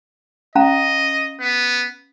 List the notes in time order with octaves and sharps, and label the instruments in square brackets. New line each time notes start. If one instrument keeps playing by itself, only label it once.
[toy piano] C#4 F5 A#5 [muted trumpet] D#5
[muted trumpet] B3